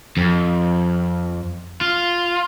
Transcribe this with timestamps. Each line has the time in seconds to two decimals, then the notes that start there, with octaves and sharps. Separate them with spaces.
0.17 F2
1.81 F4